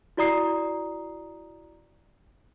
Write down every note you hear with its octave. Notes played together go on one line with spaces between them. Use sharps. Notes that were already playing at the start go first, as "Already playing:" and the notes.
E4 F#4 D5 A#5 D#6 C7